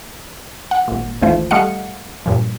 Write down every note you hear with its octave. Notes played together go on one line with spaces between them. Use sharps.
F#5
G#1 A#2
G#1 D#2 E3 A3 F4 C5
G3 A3 D#5 F5 F#5 C#7
G2 A#2 F3